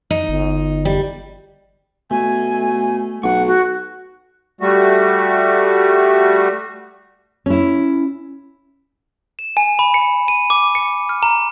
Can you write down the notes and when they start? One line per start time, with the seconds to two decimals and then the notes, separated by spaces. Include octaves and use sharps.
0.11 D#4
0.29 G1
0.85 G3
2.11 B2 A3 G#5
3.23 B1 F#5 C#6
3.47 F#4
4.61 G3 A3 F#4
7.46 C#4 E4
9.39 E7
9.57 G#5
9.79 B5
9.94 C#7
10.28 D#7
10.50 D6
10.75 C#7
11.09 F6
11.23 A#5